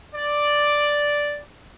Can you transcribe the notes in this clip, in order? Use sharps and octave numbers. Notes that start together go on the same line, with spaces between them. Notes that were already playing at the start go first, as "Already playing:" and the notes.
D5